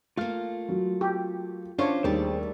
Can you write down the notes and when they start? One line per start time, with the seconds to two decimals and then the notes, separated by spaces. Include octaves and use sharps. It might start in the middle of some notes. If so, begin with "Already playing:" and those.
0.17 A3 A#3 F4 F5 F6
0.69 F#3
1.01 G4
1.78 C#4 D4 F4 C5 C#5
2.04 D#2 G3 A3 G#4 C5 D5